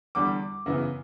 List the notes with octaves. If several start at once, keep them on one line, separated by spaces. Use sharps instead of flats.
E2 D3 G3 D6
F#2 C#3 E3 B3